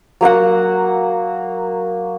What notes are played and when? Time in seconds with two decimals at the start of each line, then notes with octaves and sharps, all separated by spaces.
0.21 F#3 A#3 F#4 F#5